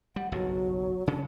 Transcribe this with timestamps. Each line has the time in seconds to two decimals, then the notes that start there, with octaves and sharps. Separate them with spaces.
0.16 G3 F#5
0.32 F#1 B1 G2 F#3
1.07 C#3 C#4 D4